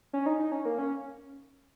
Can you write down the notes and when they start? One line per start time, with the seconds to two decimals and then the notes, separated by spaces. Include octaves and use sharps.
0.13 C#4
0.26 D#4
0.39 D#4
0.52 C#4
0.65 A#3
0.78 C#4